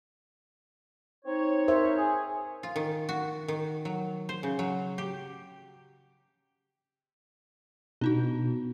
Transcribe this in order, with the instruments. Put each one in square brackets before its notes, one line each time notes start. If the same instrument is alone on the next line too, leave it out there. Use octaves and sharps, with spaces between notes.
[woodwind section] C4 D#4 C#5
[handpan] A#4 C5 E5
[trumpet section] G#4
[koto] F4
D#3
F#4
D#3
F#3
C5
C#3
F#3
G4
[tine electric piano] B2 [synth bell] D4 D#4 F#4